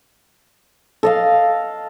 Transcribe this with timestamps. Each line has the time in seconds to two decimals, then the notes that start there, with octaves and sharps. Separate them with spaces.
1.03 A4 D#5 F5